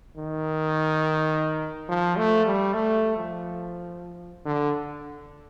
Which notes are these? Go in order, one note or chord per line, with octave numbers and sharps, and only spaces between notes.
D#3
F3
A3
G3
A3
F3
D3